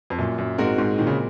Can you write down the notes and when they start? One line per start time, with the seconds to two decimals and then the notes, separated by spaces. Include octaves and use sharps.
0.10 F2
0.18 F#2 A#2
0.38 F#2
0.58 G#2 G#3 C4 F#4 A#4
0.78 G#2
0.98 A#2 D#3
1.07 C#3